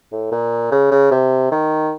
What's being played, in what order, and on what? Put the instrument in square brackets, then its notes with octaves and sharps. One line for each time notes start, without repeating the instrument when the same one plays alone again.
[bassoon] A2
A#2
C#3
C#3
C3
D#3